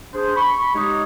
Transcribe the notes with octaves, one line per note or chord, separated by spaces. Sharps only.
D4 G#4 C5
B5 C#6
G#3 D#4 G4 C#5 D#5